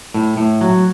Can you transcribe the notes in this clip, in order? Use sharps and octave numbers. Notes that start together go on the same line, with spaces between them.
A2
A2
F#3